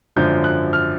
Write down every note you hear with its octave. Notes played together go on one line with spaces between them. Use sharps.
G#1 F#2 D3 F3 G6
F#6
F6